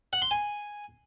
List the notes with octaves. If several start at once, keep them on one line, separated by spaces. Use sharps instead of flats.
F#5
C6
G#5